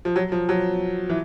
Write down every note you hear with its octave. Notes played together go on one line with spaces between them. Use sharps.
F3
F#3
F3
F#3
E3